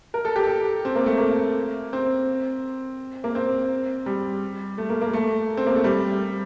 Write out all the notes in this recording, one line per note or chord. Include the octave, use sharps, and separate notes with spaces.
A#4
A4
G4
A4
C4
A#3
A3
A#3
C4
A#3
C4
G3
A3
A#3
A#3
A3
C4
A#3
A3
G3